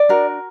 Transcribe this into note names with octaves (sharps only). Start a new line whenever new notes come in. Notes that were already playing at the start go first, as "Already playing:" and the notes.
Already playing: D5
D4 F#4 A#4